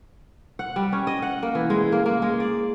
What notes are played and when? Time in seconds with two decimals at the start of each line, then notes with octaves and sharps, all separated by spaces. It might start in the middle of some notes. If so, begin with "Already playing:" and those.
0.59 F#5
0.76 G3
0.93 C#4
1.07 D#5
1.22 F#5
1.43 A#3
1.55 E3
1.70 G#3
1.92 A#3
2.06 A#3
2.22 G#3
2.40 D5